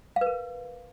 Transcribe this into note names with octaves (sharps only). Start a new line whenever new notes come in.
F5
B4
A#4